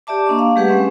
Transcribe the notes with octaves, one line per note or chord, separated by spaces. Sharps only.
G4 D5 E5 A5 D6
A#3 D4 D#5 C#6 D6
F5
G3 A3 G4 G#4 B4 F#5
G#3 C4 C#4 E5